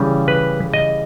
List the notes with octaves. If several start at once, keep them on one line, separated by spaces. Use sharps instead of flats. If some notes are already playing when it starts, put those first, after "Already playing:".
Already playing: C#3 E3 G3 C#4
B4
D#5